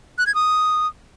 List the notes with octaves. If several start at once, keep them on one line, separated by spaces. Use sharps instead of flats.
F#6
G#6
D#6